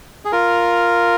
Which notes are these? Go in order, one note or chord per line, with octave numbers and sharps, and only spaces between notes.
G#4
F4 A#4